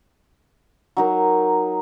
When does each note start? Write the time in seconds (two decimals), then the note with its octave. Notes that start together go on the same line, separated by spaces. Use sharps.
0.97 F#3 D#4 A#4